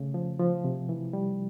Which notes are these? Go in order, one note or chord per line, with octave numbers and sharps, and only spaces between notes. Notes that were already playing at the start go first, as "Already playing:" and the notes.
Already playing: C#3 A3
F3
F3
C3
E3
G3